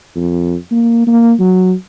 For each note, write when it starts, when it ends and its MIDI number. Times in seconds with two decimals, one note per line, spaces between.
0.16 0.55 41
0.71 1.06 58
1.07 1.33 58
1.39 1.73 54